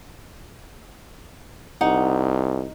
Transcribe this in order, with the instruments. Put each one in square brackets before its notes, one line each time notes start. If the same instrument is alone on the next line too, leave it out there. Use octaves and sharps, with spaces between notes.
[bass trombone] C2 [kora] D#4 [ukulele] F#5